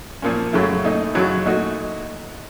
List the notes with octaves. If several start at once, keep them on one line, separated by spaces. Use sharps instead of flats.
A#2 F3 A#3 C#4
F#2 C#3 A3
A#2 A3 D#4
F#2 C#3 F#3
A#2 A3 D#4 F#4